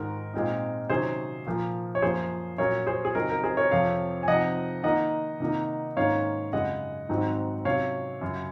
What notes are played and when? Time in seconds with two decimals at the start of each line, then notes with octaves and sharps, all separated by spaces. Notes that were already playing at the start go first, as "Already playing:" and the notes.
Already playing: G#2 D#3 G#3 A#4
0.34 A#2 G#3 C4 D#4
0.90 C3 D#3 F#3 C#4 G#4 C5
1.46 A#2 F3 A#3
1.95 C#5
2.02 F#2 F3 A#3 C#4 G#4 C5
2.58 A#2 F#3 C#4 A#4 C#5
2.87 G#4 C5
3.05 G#4
3.15 C#3 F#3 C4 D#4 A#4
3.29 A#4
3.43 G#4 C5
3.57 A#4 C#5
3.71 F2 C3 F3 C4 C#5 F5
4.23 G#5
4.28 C3 F3 C4 D#4 D#5 F#5
4.84 D#3 A#3 D#4 D#5 F#5
5.40 C3 D#3 A#3 D#4
5.97 G#2 D#3 A#3 C#4 C#5 F5
6.53 F#2 C#3 G#3 D#5 F#5
7.09 G#2 D#3 F#3 C4 D#4
7.65 C3 F#3 C#4 C#5 F5
8.21 F#2 C#3 F#3